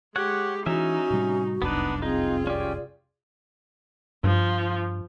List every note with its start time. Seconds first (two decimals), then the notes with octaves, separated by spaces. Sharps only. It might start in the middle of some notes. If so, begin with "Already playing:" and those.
0.16 G#3 G4 C#5 F#5
0.66 E3 C#4 D#4 F#4 E5
1.10 A2 C3 G3
1.62 F1 C2 F#2 B3 D4 D#4 B4
2.02 C4 D#4 F4 G#4
2.47 C#4 G4 D5
4.24 G2 F3